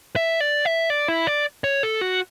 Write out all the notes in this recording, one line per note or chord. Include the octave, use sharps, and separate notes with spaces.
E5
D5
E5
D5
E4
D5
C#5
A4
F#4